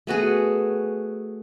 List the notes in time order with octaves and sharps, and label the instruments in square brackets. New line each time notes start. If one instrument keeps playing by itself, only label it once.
[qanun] A3 B3 F#4 G#4